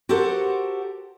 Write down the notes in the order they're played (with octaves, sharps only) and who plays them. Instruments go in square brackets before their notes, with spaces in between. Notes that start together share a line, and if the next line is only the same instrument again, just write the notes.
[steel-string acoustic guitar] F#4 G4 A4 A#4 C5 F#5